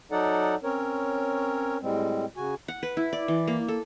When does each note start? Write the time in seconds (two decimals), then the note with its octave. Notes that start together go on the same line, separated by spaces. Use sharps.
0.12 F#3 D#4 A4 D5 F#5
0.64 C4 C#4 A#4 C#5
1.82 A2 G3 G#3 C4
2.37 C#3 F#4 G#5
2.68 F#5
2.83 B4
2.97 E4
3.13 D5
3.28 E3
3.48 A#3
3.68 A4